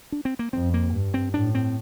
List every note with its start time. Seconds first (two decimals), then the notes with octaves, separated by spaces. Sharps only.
0.12 D4
0.25 C4
0.39 A#3
0.53 F2 C4
0.74 A#3
0.93 G2
1.14 C4
1.34 A2 D4
1.55 C4